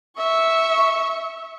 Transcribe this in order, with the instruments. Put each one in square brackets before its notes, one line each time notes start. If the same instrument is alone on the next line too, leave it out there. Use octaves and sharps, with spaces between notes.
[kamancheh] E5 C#6